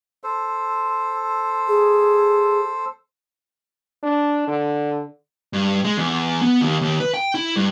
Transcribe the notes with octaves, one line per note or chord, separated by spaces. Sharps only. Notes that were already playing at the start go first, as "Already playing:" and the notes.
A4 C5
G#4
D4
D3
G2
G#3
E2
B3
D#2
D#2
B4
G5
E4
G2